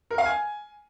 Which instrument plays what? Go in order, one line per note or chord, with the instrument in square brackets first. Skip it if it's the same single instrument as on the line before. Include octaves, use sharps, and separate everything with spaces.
[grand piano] A#4
F5
G#5